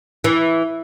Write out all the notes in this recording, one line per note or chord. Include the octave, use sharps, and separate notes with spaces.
E3